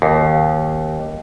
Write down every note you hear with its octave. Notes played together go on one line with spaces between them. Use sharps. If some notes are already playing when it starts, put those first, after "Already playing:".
D#2